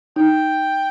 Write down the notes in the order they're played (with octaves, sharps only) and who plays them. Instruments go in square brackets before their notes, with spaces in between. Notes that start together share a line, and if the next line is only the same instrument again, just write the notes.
[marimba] D#4 [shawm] G5